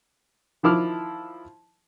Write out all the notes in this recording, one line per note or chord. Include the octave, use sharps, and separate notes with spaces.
D#3 F3 E4 D6 F6